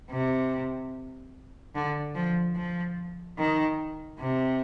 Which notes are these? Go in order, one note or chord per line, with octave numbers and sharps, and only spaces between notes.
C3
D3
F3
F3
D#3
C3